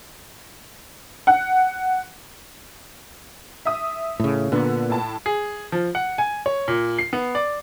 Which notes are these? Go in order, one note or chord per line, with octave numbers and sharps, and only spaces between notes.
F#5
E5 D#6
A2 C#3
A#2 D3 B3
A2 A5
G#4
F3
F#5
G#5
C#5
A#2
C7
B3
D5